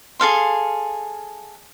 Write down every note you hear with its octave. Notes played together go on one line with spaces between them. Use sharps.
G#4 A4 F5 C6